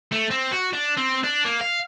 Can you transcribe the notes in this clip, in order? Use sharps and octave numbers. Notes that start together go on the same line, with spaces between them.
A3
C4
F#4
D4
C4
D4
A#3
F5